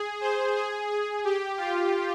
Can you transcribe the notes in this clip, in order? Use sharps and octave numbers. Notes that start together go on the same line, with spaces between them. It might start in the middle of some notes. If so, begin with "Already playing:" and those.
Already playing: G#4
C5
G#4
G#4
G4
F4